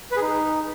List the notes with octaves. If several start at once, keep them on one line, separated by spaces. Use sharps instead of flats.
B4
G#4
D#4